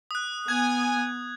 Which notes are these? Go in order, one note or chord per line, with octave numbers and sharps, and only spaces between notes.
D#6 F#6
B3 G#5 G#6